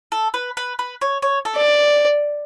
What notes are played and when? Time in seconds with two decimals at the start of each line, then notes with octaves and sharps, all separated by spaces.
0.12 A4
0.34 B4
0.57 B4
0.79 B4
1.01 C#5
1.22 C#5
1.45 A4
1.56 D5